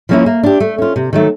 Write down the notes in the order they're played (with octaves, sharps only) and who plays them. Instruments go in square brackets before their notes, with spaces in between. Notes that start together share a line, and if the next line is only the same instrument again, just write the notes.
[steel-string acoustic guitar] F3 A#3 C#4 E4
A#3
D4 G4
A3
C#4 F4
C3
D#3 F#3 A3